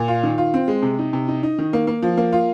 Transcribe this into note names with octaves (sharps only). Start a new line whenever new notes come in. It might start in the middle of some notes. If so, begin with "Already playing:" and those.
Already playing: A#2
F4
D#3
F4
C4
G#3
C3
D#4
C3
D#4
D#4
D#3
A#3
A#3
F3
A#3
F4